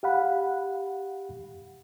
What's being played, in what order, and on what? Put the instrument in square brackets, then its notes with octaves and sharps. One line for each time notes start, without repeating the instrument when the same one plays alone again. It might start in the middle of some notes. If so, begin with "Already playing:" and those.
[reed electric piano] G4 F5 F#5 B5